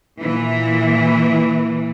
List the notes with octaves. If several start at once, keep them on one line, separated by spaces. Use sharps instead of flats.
A#2 E3